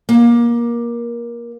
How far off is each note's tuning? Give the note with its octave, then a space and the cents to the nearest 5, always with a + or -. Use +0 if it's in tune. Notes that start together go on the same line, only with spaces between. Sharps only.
A#3 +20